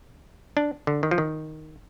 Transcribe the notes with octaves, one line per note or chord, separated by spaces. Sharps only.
D4
D3
D#3
F3
D#3